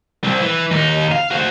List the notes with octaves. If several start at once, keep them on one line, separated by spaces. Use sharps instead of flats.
C2 C4
E3
D#2 D#4
F5
F#4 C5